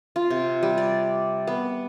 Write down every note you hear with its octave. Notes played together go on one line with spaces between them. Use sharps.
F4
C3
G3
D5
B3